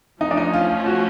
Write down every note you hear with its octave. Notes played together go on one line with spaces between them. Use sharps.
F3 A3 C#4 D#4
D4
D#4
F4
F4
F#4